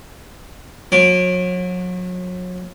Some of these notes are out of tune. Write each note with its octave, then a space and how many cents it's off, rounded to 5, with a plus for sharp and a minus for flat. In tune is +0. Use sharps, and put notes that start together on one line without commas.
F#3 -35 D6 -5